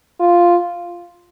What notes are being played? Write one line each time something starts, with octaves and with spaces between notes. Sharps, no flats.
F4